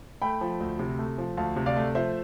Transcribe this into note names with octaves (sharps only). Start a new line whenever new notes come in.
A3 G5 B5
F3
D2
C3
A3
F3
D2 F5 A5
C3
D5 F5
A3
F3 C5 E5